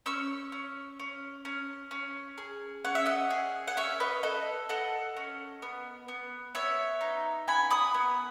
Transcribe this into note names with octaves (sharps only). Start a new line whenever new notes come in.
C#4 C#6 E6
C#4
C#4
C#4
C#4
G#4
C#4 F#5
E5
D#5 F#5
G#4
F#5
C#4 C#5 E5
B4 D#5
A4 B4 D#5
A4 D#5 F#5
C#4
B3
B3
B3 C#5 E5
D#4
B3 G#5 B5
B5 D#6
B3